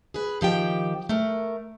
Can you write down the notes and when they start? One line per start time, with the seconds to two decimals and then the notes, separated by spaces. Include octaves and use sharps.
0.14 G#4 B4
0.41 D#3 F3 G4 G5
1.09 A3 A#4